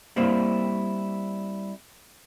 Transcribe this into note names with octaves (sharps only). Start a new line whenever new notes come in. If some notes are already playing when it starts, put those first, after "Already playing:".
G3 A#3 C4 E4 C5